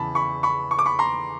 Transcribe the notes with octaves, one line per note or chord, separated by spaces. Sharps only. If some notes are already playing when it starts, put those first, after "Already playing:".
Already playing: E2 C#3 E3 A5 B5
B5 C#6
B5 C#6
C#6
D6
B5 C#6
A#5 C6